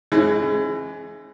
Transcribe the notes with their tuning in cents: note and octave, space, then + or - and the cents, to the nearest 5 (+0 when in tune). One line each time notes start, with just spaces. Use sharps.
E3 +30 G#3 +15 C#4 -45